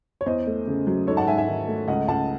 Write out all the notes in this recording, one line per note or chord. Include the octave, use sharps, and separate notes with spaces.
C#5
E2 C5 D#5
A3
C#3
F#3
G#2 A4 C#5
F#5 A5
G#2 E5 G#5
E5 G#5
D#3
A3
C#2 D#5 F#5
C#2 F#5 A5